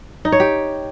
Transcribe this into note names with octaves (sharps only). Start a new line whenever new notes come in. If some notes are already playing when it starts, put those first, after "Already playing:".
D#4
C#5
G4